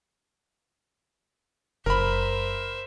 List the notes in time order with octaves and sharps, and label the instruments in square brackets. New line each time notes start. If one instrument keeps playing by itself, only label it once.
[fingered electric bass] F#1 [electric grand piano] A#4 B5 [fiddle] C5 E5